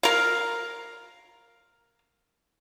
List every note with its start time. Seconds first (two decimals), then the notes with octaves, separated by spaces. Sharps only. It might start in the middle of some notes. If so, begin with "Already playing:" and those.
0.03 A#4 F5